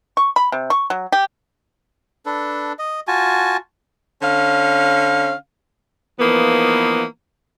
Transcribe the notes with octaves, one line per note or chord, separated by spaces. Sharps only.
C#6
B5
C3
C#6
F#3
G4
D4 A4 B4
D#5
F4 F#4 G#5 A5
D3 C#4 F5
E3 F3 A#3 B3 D#4